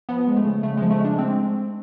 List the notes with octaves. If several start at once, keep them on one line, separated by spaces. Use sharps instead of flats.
F3 B3
G#3
A3
C#3
C#3 A3
G#3
F3
A3
G#3
D4
G#3 C4